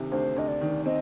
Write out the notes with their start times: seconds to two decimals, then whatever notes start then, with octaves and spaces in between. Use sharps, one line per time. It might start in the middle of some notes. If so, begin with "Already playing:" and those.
Already playing: D2 C3 D#3
0.12 D2 C5
0.36 D2 D#5
0.48 D5
0.61 D#3
0.86 C4 D#5